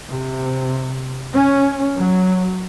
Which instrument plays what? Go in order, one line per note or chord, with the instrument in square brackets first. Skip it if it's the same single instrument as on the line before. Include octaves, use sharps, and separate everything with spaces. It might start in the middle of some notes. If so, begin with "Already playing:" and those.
[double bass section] C3
C#4
F#3